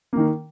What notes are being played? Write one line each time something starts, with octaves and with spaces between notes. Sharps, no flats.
D#3 A#3